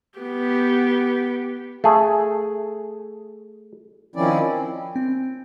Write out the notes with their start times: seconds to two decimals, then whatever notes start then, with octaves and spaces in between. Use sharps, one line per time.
0.19 B3 G4
1.84 A3 G#4
4.16 D#3 F3 C4 C#4 E4 D5
4.48 C4
4.96 C4